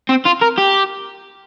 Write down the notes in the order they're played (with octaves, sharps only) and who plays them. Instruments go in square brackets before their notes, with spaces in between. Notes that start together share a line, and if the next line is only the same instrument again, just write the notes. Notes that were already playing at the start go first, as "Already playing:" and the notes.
[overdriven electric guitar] C4
F4
A#4
G4